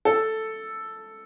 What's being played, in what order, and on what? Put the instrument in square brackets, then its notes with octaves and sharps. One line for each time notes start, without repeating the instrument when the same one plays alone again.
[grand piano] A4